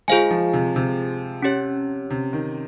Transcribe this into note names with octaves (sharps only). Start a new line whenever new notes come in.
G#3 F4 G#4 C5 F5 G#5
F3
C3
C3
C#4 G4 C#5
C3
D#3